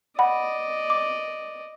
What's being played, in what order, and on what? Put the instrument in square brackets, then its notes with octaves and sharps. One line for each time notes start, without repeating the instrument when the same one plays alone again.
[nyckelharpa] D5 D#5 [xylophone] F#5 B5
[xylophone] D6